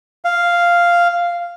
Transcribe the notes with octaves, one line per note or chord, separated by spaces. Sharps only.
F5